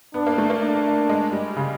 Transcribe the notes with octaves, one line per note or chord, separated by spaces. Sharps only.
B3 D4
A#3
A3
A#3
D4
G#3
G3
C#3